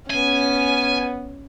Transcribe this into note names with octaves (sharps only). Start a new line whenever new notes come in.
B3 C#4 G#5